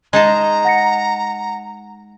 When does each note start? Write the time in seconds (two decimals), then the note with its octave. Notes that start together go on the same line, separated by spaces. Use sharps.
0.13 G#3 D#4 A5 A#5
0.65 F#5 A#6 C#7